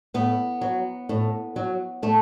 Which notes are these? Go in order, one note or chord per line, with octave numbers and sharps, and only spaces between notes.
A2 B3
F#3
A2
F#3
A2 A3